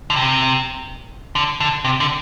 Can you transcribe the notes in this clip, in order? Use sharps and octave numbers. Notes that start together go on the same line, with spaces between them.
D3
C3
D3
D3
C3
D3